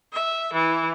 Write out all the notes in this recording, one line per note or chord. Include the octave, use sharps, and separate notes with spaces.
E5
E3